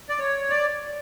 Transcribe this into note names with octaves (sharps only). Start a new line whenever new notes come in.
D5
C#5
D5